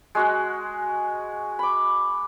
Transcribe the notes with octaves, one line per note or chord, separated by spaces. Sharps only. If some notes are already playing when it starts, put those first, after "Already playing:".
G#3 F#4 F#5
B5 D6